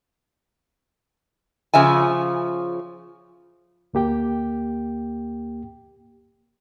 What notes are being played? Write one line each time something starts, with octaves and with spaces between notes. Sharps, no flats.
C#3 F3 E5 G#5
D2 A#3 G4 G5